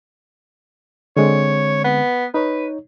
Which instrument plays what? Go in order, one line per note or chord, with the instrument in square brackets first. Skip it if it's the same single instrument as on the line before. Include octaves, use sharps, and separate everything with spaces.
[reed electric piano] D3 G#3 C4 [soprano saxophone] C#5
[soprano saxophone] B3
[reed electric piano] D#4 C#5 [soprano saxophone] B4